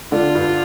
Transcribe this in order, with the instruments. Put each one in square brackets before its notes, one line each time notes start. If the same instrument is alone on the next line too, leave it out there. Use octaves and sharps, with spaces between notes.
[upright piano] D3 [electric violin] F4
[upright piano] G2